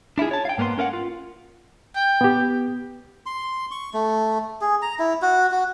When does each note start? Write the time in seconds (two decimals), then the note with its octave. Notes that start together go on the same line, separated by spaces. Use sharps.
0.18 D4 E4 F4 G#4
0.31 C#5 A5
0.45 F5 G5
0.58 G#2 A#3 B3 B4 C6
0.78 C#4 A#4 F5 F#5
0.93 F4
1.96 G5
2.21 B3 G4
3.26 C6
3.71 C#6
3.94 A3
4.61 G#4
4.82 A#5
4.99 E4
5.22 F#4
5.52 F#4